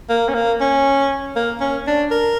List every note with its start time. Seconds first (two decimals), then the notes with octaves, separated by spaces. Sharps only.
0.09 A#3
0.29 C#4
0.35 A#3
0.60 C#4
1.36 A#3
1.61 C#4
1.87 D4
2.11 A#4